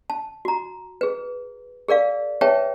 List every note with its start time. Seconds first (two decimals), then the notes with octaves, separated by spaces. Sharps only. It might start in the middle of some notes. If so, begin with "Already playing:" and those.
0.10 A5
0.45 F#4 A#5
1.01 G#4 B4
1.88 G#4 A#4 D5 F5
2.41 G#4 B4 C#5 E5 G5 A5